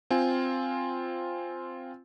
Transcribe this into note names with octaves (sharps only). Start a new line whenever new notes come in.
C4 F4 G#5